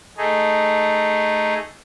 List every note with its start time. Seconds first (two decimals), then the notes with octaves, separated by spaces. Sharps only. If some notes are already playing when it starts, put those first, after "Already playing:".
0.17 A3 D#4 G#4